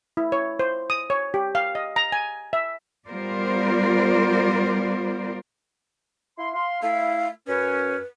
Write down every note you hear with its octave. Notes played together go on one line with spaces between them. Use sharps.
E4
C#5
C5
D#6
C#5
G4
F5
D#5
A#5
G#5
E5
G3 B3 F4 A#4 C5 D5
E4 F5 C6
F5 C6
A3 E4 F5
F#2 C#4 B4